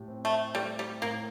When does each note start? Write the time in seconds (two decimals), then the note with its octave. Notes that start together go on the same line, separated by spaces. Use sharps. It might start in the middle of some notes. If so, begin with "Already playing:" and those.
Already playing: A2 G4
0.08 C4
0.25 A3
0.55 G3 A3
0.79 G3
1.02 A2 A#3